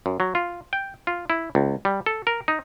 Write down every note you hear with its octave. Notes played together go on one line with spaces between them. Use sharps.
F#2
F#3
F4
G5
F4
E4
C#2
G3
A4
A#4
D#4